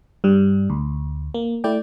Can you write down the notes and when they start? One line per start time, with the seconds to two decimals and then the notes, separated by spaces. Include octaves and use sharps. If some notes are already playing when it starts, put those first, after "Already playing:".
0.24 G2 G3
0.70 D2
1.34 A#3
1.64 A3 E4 D5 G5